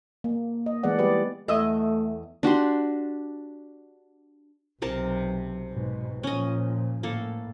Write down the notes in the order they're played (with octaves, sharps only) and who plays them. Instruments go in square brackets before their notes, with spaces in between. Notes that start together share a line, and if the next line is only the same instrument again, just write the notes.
[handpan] A#3
D#5
E3 G#3 B3 D5 F#5
G3 G4 B4 D5
[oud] E2 D#5 E5 [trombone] A3
[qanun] D4 F#4 G4 C6
[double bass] B1 F#3 [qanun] C3 A#4 A5
[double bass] G#2 B2
[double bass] A#2 F3 [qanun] C#4 D#5
[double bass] A2 [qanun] A#3 A4